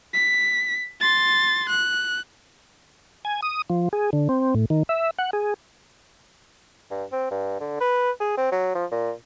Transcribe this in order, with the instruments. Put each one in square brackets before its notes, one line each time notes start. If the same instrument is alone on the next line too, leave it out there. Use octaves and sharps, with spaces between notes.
[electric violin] B6
C6 A6
F#6
[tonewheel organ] G#5
D#6
F3
G#4
D3
C4
A2
D#3
E5
F#5
G#4
[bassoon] G2
C4
G2
D3
B4
G#4
C4
F#3
F3
A#2